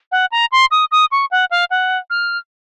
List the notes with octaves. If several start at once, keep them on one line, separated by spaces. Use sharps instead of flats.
F#5
A#5
C6
D#6
D#6
C#6
F#5
F5
F#5
F6